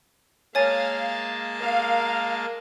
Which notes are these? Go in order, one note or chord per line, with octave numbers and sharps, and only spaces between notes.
G#3 A#3 C#5 F5 G#5 A5 A6
A#4 F5